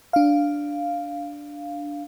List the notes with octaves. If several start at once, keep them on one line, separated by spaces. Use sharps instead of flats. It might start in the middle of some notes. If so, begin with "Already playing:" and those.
D4 F5